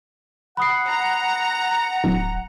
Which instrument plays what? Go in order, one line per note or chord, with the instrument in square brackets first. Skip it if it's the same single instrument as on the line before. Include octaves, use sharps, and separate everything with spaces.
[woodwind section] F#5 [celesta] B5 D#6 C7
[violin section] A#5
[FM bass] D1